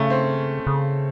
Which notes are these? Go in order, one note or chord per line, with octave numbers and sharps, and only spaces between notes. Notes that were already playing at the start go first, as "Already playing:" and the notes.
Already playing: C#3 A3 C#4
C4
C#3